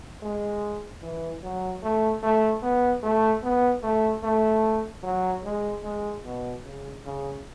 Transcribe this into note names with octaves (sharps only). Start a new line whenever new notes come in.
G#3
E3
F#3
A3
A3
B3
A3
B3
A3
A3
F#3
G#3
G#3
B2
C#3
C#3